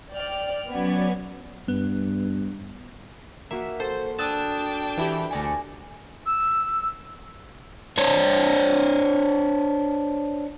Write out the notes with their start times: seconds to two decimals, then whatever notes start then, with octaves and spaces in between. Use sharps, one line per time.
0.13 D5 G5 F6
0.69 F#3 B3 C#4 D5 G#6
1.68 G2 B3
3.51 A#3 F#4 E5
3.80 A4 C5
4.19 D4 G5 A5 D#6 E6 F#6
4.97 E3 E4 G4
5.31 D2 D5 G#5 A#6 C#7
6.26 E6
7.98 D4 C5 C#5